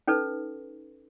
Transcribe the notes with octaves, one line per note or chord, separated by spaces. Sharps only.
C#4 D#4 A4 B4